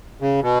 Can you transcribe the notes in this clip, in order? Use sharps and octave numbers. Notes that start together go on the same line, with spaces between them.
C#3
B2